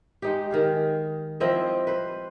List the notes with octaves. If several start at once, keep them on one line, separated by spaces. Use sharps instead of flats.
G#3 D#4 G4
D#3 G#4 F5
F3 C4 E4 D#5
B4 C5